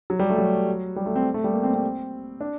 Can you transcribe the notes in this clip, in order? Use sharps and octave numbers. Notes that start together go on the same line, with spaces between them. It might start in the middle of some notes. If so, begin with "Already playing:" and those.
F#3
G3
A3
F#3
G3
A3
C4
A3
G3
A#3
C4
C4
D4